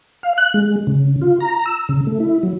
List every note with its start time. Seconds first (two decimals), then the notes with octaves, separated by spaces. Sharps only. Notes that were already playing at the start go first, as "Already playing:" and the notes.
0.23 F5
0.38 F#6
0.54 G#3
0.87 C#3
1.22 F4
1.40 A#5
1.66 E6
1.89 C#3
2.07 A3
2.20 E4
2.43 F#3